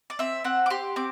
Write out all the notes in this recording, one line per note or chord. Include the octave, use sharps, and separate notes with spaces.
D5
C4 E5
C4 F#5
D6
G4 C6
C4 D6